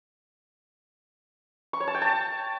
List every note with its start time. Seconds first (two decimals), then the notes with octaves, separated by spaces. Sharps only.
1.73 C#6
1.80 C#5
1.87 A5
1.95 G5
2.02 A5